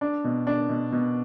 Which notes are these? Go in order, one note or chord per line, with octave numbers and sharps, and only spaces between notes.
D4
B2
D4
B2
B2